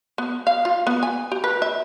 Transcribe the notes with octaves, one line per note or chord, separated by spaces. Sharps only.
B3
F5
F4
B3
G#5
G4
B4
E5